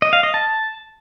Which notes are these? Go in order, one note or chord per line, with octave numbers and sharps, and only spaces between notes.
D#5
F5
D#5
A5